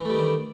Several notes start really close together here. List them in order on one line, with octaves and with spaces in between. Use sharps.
E3 A3 G3 D#3 D4